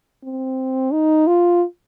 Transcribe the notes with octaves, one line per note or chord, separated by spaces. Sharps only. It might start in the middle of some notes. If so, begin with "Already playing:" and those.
C4
D#4
F4